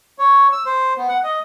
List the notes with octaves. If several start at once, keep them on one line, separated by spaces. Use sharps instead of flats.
C#5
E6
C5
B3
F#5
D#5